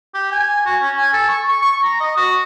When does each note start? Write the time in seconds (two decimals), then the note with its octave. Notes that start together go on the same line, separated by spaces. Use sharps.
0.14 G4
0.31 G#5
0.66 F#4
0.82 C#4
0.97 G#5
1.13 A4
1.28 C#6
1.48 C#6
1.62 C#6
1.83 A#5
2.00 D#5
2.17 F#4